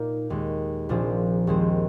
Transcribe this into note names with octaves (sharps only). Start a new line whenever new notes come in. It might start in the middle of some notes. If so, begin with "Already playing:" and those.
Already playing: A#2 A#3 D#4
D#2 D#3 G#3
A#1 A#2 F3 G#3 C4
D#2 D#3 G#3 C4